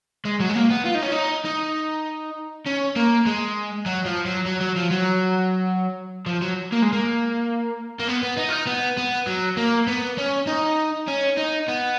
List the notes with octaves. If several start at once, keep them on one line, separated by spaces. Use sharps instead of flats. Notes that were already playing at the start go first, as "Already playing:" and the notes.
G#3
F#3
G#3
A#3
B3
F4
D#4
C#4
D#4
D#4
C#4
A#3
G#3
F#3
F3
F#3
F#3
F#3
F3
F#3
F3
F#3
A#3
G#3
A#3
A#3
B3
B3
D#4
F4
D#4
B3
B3
F#3
A#3
B3
C#4
D#4
C#4
D#4
B3